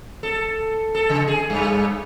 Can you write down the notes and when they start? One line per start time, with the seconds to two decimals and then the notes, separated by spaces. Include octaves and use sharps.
0.23 A4
0.95 A4
1.10 C#3
1.28 G#4
1.50 G2